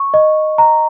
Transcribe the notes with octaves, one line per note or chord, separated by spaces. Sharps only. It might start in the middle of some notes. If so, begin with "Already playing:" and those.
Already playing: C#6
D#5
A#5